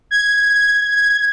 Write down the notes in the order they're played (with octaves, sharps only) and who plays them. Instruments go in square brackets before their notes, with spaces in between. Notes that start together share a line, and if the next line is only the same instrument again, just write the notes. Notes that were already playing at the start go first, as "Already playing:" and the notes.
[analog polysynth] G#6